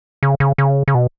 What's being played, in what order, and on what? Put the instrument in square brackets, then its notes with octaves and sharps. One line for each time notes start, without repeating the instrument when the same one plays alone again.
[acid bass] C#3
C#3
C#3
C#3
B2